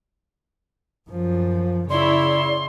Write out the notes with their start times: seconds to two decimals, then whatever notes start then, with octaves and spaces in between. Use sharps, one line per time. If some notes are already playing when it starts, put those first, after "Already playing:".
1.10 F#2 F3
1.90 C#3 E4 C#5 D5 C6